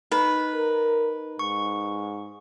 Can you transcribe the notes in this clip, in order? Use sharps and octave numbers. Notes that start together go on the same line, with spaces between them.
D#4 B4
A#4
G#2 C#6